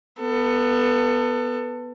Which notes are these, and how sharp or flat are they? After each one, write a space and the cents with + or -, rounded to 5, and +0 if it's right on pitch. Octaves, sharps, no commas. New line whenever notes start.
B3 +0 A4 +25